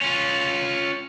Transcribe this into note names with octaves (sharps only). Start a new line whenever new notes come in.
C#4 F4